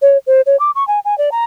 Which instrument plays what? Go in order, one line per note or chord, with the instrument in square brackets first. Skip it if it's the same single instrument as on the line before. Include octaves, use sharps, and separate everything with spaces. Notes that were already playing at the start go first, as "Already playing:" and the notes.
[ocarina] C#5
C5
C#5
D6
C#6
G#5
G#5
D5
A#5